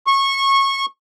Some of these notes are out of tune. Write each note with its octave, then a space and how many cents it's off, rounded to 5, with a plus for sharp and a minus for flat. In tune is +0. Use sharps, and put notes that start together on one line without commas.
C#6 -20